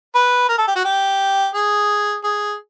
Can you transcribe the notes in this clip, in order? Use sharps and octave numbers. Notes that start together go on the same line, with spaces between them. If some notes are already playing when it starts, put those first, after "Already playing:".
B4
A#4
A4
G4
F#4
G4
G#4
G#4